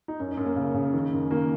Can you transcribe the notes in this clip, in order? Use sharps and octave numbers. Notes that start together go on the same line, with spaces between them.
D#4
F#2 C#4
C#4
F#2
A#3
C#3
C#3
D#3
F#2
D#3 A#3